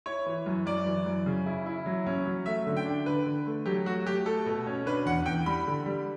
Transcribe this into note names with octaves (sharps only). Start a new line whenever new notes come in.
E4 C#5
E3
F#2
F#2 D5
E3
F#2
C#3
E4
E4
F#3
C#4
F#3
A3 E5
D3
G5
D4
D3 B4
D3
A3
F#3 G4
A3 F#4
A3 G4
A3 A4
B2
C#4
D4 B4
E2 F#5
E2 G5
G3 B5
D3
G3